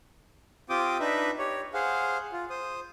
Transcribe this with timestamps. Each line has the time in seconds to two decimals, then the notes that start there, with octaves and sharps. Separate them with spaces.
0.69 C4 F4 G4 G5 D6 D#6
1.00 D4 D#4 B4 E5
1.39 G4 C#5
1.74 G#4 C5 F5 F#5
2.32 F4
2.50 C5 D#6